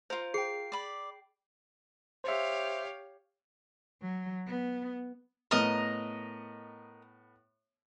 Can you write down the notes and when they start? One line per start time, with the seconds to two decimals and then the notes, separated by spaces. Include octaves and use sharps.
0.10 F4 A#4 C5
0.34 G#4 G5 C7
0.72 D5 B5
2.24 G4 C5 C#5 E5 F5
4.02 F#3
4.48 B3
5.51 A2 B3 A#4 D#5 F6